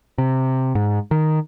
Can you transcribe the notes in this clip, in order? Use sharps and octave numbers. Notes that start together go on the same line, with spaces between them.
C3
G#2
D#3